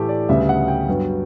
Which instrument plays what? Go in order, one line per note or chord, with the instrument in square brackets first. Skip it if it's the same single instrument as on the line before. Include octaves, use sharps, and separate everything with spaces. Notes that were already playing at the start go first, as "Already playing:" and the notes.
Already playing: [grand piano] A2 E3 A3 G4 A4
D5
D2 C#3 G3 B3 E5
F#5
G5
G2 F#3 B3